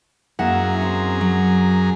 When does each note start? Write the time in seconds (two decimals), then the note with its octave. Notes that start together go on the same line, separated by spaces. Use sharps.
0.39 F#2 A#3 E4 G#4 F#5 A#5
0.82 C4
1.21 F#3